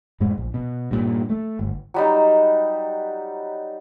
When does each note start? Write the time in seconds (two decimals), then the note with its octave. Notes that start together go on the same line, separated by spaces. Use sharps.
0.20 F#2 A2 G#3
0.37 A#1
0.54 B2
0.91 G2 A#2
1.30 A3
1.59 G1
1.94 F#3 G3 D#4